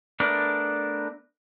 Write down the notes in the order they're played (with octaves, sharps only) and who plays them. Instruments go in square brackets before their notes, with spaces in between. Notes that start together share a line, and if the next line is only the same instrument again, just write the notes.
[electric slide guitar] A3 B3 D4 A#4